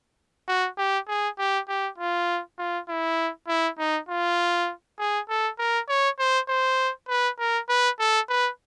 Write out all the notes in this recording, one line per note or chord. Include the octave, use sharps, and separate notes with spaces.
F#4
G4
G#4
G4
G4
F4
F4
E4
E4
D#4
F4
G#4
A4
A#4
C#5
C5
C5
B4
A#4
B4
A4
B4